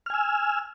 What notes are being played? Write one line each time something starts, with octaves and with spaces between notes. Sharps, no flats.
G#5 E6 F6